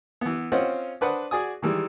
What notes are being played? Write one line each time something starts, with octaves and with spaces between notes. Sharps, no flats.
E3 B3
C4 C#4 F4 C5 D#5 F#5
D4 B4 C5 F#5 D#6
F#4 G#4 D5 G#5 D#6
D#3 E3 G3 G#3